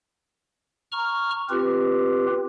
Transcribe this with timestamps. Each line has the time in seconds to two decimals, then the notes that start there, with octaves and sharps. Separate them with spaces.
0.92 A#5 C#6 F6
1.50 C4 F4 G4 B4